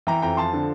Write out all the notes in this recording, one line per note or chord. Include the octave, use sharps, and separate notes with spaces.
E3 G5 A#5
F2 G5 A#5
F3 A5 C6
D3